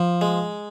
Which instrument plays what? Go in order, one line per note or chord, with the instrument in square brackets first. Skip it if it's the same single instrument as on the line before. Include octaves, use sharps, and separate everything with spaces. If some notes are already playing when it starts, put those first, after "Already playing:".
Already playing: [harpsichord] F3
G#3